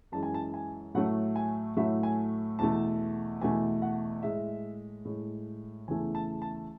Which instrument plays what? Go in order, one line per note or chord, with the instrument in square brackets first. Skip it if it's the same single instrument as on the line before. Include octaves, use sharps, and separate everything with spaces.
[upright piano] F#2 E3 G#3 A5
G#5
A5
G#5
A2 F#3 A3 F#5
G#5
A2 F#3 A3 E5
G#5
E2 B2 A3 A5
E2 B2 A3 G#5
F#5
A2 G#3 E5
A2 G#3
E2 C#3 E3 A3 G#5
A5
A5